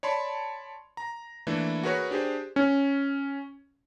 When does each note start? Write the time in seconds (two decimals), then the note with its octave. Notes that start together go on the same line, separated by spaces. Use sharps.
0.03 C#5 D5 A5 B5 C6
0.97 A#5
1.47 E3 A3 A#3 D4 E4
1.83 F#4 G#4 A#4 B4 C#5 C#6
2.11 D4 G4 G#4 C5
2.56 C#4